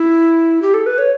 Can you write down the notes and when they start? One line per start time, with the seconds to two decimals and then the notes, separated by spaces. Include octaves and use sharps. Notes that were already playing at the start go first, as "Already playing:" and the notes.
Already playing: E4
0.62 G4
0.74 A4
0.86 B4
0.98 C#5